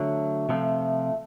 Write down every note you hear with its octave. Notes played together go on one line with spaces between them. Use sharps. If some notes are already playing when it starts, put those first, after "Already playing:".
Already playing: D3 F#3 A3
C3 F3 A3